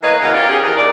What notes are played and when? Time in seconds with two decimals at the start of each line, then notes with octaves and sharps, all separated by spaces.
0.02 E3 A#3 B3 B4 C#5 D#5
0.21 C#3 E3 F#3 B3 A#4 F5
0.34 C#4 F4 G4 A#4 D5 F5
0.49 C#4 D#4 G4 G#4
0.63 E3 F3 D#4 A#4
0.77 A#2 D5